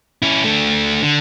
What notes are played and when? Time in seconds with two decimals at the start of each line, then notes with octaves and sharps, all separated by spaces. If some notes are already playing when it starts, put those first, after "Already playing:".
0.22 C#4 E4
0.44 A3 D4
1.02 D3